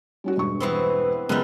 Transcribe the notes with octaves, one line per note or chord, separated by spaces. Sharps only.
G3 C#4 F#4
E1 G2 C#6
E3 B3 C4
C#2 F#2 G3 B3 F#6